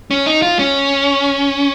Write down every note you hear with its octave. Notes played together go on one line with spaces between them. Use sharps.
C#4
D#4
F4
C#4